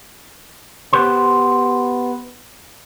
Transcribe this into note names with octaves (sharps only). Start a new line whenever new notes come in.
B3 G4 C5 C6